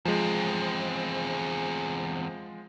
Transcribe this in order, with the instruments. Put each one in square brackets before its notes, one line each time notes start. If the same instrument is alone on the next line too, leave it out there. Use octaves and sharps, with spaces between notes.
[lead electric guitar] E2 C4 [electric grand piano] F3 G#3